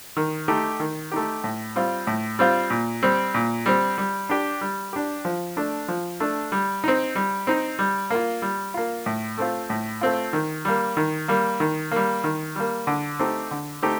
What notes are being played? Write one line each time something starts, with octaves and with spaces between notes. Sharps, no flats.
D#3
A3 D#4 G4
D#3
A3 D#4 G4
A2
G3 C4 F4
A2
G3 C4 F4
A#2
G3 C4
A#2
G3 C4
G3
D4 G4
G3
D4 G4
F3
A3 D4
F3
A3 D4
G3
C4 D#4
G3
C4 D#4
G3
A#3 F4
G3
A#3 F4
A2
A3 C4 F4
A2
A3 C4 F4
D#3
G3 A#3
D#3
G3 A#3
D#3
G3 A#3
D#3
G3 A#3
D3
A3 C4 D#4 G4
D3
A3 C4 D#4 G4